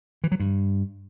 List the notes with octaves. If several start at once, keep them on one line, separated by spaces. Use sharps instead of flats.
E3
F#3
G2